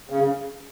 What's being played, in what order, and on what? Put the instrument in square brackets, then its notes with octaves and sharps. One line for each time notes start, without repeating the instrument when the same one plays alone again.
[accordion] C#3